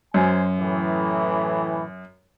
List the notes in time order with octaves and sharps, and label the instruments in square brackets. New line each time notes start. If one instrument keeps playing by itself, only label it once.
[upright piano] F#2 [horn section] C5 G#5
[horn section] A2 E3